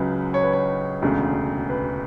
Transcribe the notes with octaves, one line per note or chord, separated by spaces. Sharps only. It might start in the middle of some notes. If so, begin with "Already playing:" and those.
Already playing: C#2 C#3 F#3 B4
C#5
B4
C#5
E1 D2 C#3
B4